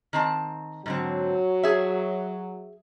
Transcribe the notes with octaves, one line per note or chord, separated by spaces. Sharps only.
D#3 C4 A5
G#2 D3 F#3 C4
G#4 E5